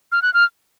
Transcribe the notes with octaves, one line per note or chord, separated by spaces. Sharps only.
F6
F#6
F6